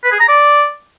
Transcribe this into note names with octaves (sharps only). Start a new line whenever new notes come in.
B4
G#4
A#5
D5